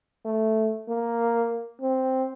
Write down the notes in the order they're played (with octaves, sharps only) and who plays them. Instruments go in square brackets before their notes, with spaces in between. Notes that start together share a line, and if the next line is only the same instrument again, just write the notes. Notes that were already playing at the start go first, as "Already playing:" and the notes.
[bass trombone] A3
A#3
C4